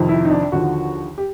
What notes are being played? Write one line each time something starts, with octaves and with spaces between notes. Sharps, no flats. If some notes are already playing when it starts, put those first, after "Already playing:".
Already playing: F2 C3 D#3
E4
D#4
D4
D#2 D3 F3 F#4
G4